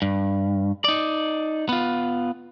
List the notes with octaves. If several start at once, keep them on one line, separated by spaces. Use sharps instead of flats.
G2
D#4 D5
B3 F4